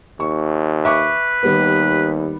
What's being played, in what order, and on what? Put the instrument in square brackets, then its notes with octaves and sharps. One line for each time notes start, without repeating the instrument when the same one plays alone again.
[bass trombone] D#2 [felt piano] C#6
[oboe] B4 [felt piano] E5 C#6 D6
[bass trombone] D#2 [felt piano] D#3 G3 B3